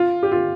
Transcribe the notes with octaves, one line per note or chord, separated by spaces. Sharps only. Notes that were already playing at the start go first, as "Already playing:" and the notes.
Already playing: F4
G4
F4